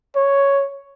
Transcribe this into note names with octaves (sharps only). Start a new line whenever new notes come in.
C#5